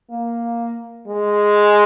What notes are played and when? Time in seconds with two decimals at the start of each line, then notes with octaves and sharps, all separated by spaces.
0.11 A#3
1.08 G#3